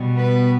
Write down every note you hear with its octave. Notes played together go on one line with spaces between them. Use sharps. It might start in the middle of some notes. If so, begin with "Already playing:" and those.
Already playing: B2 G3 B3
B4